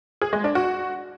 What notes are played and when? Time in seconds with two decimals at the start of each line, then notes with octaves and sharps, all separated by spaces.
0.22 G#4
0.33 G#3
0.44 D4
0.55 F#4